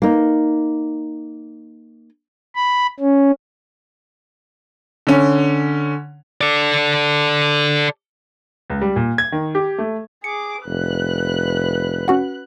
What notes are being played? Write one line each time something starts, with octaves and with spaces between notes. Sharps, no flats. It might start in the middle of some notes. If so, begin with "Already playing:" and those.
A#3 D#4
B5
C#4
D3 C#4
A4 D5
C#2
G3
A#2
G#6
D#3
G4
A3
G#4 D6 C#7
F1 B4 F#6
C#4 F#4 F#5